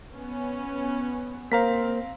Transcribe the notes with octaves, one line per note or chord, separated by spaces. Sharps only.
B3 C#4
A#3 C4 A#4 C5 F5 A#5 B6